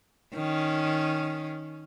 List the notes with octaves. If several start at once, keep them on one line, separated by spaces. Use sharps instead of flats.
D#3 C#4